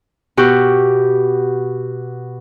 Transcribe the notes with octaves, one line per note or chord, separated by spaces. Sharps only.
B2 F#4 G4